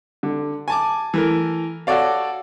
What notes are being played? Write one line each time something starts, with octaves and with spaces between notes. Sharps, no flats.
D3
G#5 A5 D6
E3 A3 A#4
F#4 A4 C#5 D5 F5